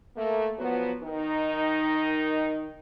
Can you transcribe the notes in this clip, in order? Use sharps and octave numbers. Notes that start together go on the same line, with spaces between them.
A3 A#3
F3 F#3 B3
D#3 D#4